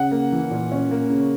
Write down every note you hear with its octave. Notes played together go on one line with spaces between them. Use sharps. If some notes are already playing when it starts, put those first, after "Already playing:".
Already playing: C#3 F#5
A#3
E3
A#2
C#4
A#3
C#3